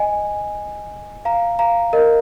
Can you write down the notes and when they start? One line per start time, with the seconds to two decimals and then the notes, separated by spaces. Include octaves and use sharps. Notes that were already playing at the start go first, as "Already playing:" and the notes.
Already playing: D#5 G#5
1.25 F5 A#5
1.59 F5 A#5
1.93 A#4 D#5